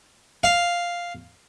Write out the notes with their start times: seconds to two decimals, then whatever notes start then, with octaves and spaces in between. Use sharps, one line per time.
0.43 F5